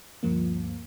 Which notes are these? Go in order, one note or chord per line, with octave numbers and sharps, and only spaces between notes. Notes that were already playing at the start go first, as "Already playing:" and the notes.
D2 G2 F3 A#3